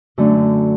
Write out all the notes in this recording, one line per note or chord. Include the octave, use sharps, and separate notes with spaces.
F#2 D3 A3 D4